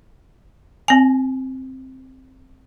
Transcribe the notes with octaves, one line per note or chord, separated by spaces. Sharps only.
C4 G#5